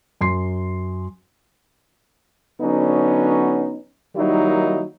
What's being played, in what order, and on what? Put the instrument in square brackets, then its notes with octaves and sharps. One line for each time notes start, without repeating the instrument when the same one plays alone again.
[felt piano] F#2 C6 C7
[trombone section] D3 F#3 B3 C#4 D#4
D#3 F#3 G3 A#3 D#4 E4